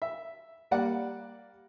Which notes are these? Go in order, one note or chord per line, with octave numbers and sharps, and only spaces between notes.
E5
G3 A#3 D5 F#5